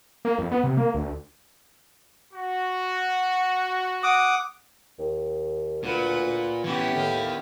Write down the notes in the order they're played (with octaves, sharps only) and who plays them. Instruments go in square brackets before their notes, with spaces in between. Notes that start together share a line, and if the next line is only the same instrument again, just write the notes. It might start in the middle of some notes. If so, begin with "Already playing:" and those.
[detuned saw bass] A#3
F2
B3
C3
A#3
D2
[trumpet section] F#4
[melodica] F#5 D6 D#6
[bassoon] D#2
[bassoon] D2 [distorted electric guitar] A#2 [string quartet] F4 B4 F#5
[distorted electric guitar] E3 C#4 [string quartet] B3 E4 G4
[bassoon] A2 [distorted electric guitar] D#3 F5